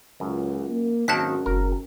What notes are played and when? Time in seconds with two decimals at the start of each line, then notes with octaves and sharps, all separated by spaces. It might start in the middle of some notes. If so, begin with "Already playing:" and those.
0.20 C#2 F#2
0.69 A#3
1.08 G#1 F#2 D#3 A#3 C4 A5 F#6 B6
1.46 F#1 A#4